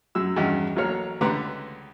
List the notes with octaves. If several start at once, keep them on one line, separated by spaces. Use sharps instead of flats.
F#2 F#3 E6
E2 G2 D#3 C#4 F#4
A1 F#3 A#3 C#5 F6
C#2 D3 G4 B4 A#5 C6